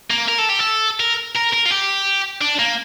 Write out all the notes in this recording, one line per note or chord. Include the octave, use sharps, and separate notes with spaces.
A#3
A#4
A4
G4
A4
A#4
A#4
A#4
F4
G4
D4
A#3